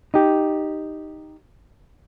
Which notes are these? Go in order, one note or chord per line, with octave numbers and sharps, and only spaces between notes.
D#4 G4